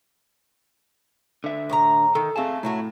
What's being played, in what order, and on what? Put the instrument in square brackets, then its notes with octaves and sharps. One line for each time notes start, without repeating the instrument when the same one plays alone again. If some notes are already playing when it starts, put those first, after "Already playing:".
[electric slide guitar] D3 E5
[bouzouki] A2 F#4 A#5
[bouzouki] D#3 [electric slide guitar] A4
[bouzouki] G#3 A3 [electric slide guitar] C4 F5 A5
[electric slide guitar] A2 [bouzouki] F#3 A3 F#4